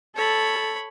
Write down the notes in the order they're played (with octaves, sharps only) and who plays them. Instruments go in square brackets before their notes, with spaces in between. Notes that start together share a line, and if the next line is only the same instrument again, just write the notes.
[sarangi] A4 [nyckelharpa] C#5 B5